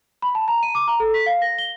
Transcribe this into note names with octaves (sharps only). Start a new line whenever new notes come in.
B5
A5
A#5
D#7
D6
A#5
A4
B6
F5
A#6
G7